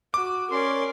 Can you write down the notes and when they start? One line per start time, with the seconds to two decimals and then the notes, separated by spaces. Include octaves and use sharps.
0.14 F#4 D6
0.51 C#4 A#4 D5 C6